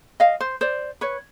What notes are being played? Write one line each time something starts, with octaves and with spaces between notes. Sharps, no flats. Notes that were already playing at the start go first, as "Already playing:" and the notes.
D#5 F5
C5
C5 D5
B4 C#5